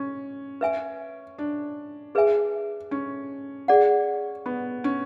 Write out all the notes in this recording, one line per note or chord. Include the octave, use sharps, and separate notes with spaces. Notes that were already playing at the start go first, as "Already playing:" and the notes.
Already playing: C#4
B4 E5 G#5
D4
G#4 B4 E5 G#5
C#4
G#4 D5 F#5
B3
C#4